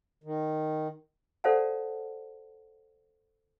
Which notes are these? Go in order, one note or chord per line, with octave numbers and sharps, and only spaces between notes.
D#3
A4 C5 D5 F5 F#5 A5